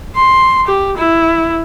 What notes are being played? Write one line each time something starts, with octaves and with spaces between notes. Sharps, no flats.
C6
G4
E4